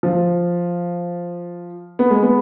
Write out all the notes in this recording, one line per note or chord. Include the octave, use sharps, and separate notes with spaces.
F3
B3
G#3
B3